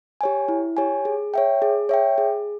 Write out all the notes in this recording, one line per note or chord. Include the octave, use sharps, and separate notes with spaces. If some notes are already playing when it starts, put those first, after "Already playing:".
G4 C#5 G#5
E4
G4 C#5 G#5
G#4
C#5 E5 G5
G#4
C#5 E5 G5
G#4